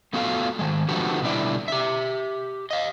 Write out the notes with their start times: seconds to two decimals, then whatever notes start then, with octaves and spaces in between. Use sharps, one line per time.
0.13 A3 B3 F4 F#4 A4 F5
0.59 D#3 G#3
0.89 D3 F3 B3 F#4 G4
1.22 B2 D3 G3 E4 D5 E5
1.68 G4 E5
2.71 D#5 F5